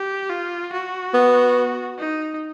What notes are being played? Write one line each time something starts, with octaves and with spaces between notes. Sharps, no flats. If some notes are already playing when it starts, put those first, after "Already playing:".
Already playing: G4
F4
F#4
B3
D#4